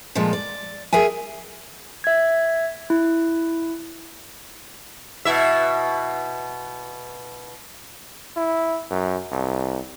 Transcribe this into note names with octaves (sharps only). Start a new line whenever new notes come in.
A#2 F3 G#3 A3
D5
G#4 A#4 E5 G#5
E5 G#6
E4
B2 E4 E5
E4
F#2
C2